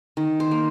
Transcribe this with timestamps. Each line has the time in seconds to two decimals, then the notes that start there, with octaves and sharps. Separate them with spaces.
0.17 D#3
0.40 C5
0.51 A#3